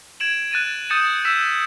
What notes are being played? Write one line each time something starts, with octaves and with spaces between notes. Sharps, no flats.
G#6 D7 E7 F#7
F#6 A6 D#7 E7
D#6 G6 A6 C#7 D#7 E7
E6 B6 E7